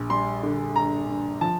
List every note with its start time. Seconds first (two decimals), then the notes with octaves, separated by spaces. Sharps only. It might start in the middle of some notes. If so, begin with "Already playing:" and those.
Already playing: A#1
0.10 G3 C6
0.43 D3
0.76 G2 A#5
1.08 G2
1.41 F3 A5